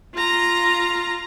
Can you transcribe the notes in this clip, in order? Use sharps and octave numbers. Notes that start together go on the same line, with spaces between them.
F4 A#5